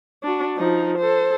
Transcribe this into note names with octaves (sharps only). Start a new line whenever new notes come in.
D4 F#4
F3 D#4
A4 C5